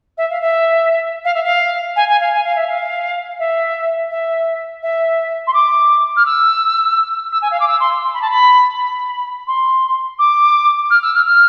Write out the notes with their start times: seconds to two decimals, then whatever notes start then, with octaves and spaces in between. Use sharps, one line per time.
0.17 E5
0.30 F5
0.41 E5
1.24 F5
1.34 E5
1.43 F5
1.96 G#5
2.08 G#5
2.20 F5
2.32 G#5
2.43 F5
2.55 E5
2.67 F5
3.39 E5
4.11 E5
4.82 E5
5.47 C6
5.53 D6
6.16 F6
6.25 E6
7.32 E6
7.42 G#5
7.51 F5
7.60 D6
7.68 E6
7.80 C6
8.03 C6
8.13 B5
8.21 A5
8.30 B5
8.76 B5
9.47 C6
10.18 D6
10.90 F6
11.02 E6
11.14 F6
11.25 F6